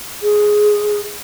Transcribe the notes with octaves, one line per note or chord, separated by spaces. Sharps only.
G#4